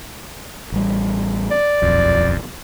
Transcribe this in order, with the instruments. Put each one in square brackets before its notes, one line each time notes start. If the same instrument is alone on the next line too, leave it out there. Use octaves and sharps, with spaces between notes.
[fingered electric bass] A1 G3
[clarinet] D5
[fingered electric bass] D#1 B1 [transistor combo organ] F2